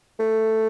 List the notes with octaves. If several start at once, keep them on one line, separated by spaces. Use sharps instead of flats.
A3